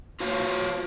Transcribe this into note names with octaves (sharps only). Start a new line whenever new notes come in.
F4 F#4 C#5 F5